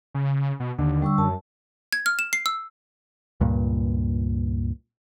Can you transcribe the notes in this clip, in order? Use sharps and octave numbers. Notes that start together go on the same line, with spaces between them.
C#3
B2
D#2 D3
G3 C#6 E6
F#2 A5
G#6
F6
E7
C7
E6
C#2 G2 A#2